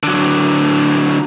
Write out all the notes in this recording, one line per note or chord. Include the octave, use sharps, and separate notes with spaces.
D3 F#3